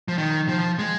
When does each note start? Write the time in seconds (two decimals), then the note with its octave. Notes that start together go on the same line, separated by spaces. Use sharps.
0.08 F3
0.18 D#3
0.49 F3
0.79 G#3